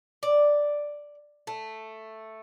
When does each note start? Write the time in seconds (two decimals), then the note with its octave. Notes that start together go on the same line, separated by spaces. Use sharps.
0.23 D5
1.47 A3